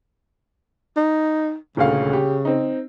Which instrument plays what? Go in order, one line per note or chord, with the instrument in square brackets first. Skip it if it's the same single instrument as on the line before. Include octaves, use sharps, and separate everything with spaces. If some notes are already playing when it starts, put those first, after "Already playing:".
[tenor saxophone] D#4
[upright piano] D#1 D2 F5 [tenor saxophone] C#3
[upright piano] G4
C4 D#4